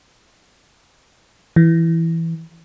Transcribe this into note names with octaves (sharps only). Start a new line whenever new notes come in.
E3